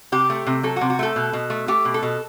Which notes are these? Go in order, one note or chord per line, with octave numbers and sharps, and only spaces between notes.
C3 G4
A3
C3
F#3 A4
F#4
C3
F#4
A3 A4
B2
B2
A3
A3 G4
B2
A4
B2